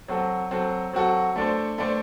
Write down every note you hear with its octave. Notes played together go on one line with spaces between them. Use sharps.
F#3 C4 F#4 A4
F#3 C4 F#4 A4
F#3 C4 F#4 A4
A3 D4 A4 C5
A3 D4 A4 C5